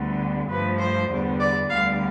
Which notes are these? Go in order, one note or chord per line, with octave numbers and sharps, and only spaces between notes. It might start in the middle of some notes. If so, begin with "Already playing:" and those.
Already playing: D2 D3 G3 B3
G2 F3 A3 B4
C5
E2 D3 G3 B3
D5
D2 D3 G3 B3 F5